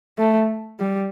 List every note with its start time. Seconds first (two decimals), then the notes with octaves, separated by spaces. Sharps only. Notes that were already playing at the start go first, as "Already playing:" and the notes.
0.18 A3
0.80 G3